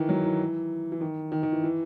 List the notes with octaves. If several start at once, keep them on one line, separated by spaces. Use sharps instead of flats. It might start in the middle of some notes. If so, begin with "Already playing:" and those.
Already playing: D#3 E3
F#3
E3
E3
D#3
D#3
D#3
E3
E3